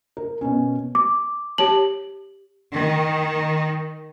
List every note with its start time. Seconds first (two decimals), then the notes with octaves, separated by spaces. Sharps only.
0.17 A#4
0.41 B2 C#4
0.95 D6
1.58 G4 C#5 A5 F#7
2.72 D#3